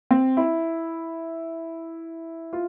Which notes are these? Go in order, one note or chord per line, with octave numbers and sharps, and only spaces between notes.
C4
E4
F4